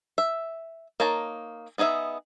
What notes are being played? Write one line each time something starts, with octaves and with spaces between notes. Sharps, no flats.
E5
A#3 D#4 C#5 A5 A#5
B3 D#4 G#4 D#5 E5